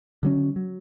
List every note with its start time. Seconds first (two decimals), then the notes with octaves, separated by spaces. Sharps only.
0.23 D3 F#3 C#4
0.56 F#3